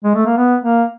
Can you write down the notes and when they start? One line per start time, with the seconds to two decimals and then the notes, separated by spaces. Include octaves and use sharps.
0.04 G#3
0.15 A3
0.26 A#3
0.37 B3
0.64 A#3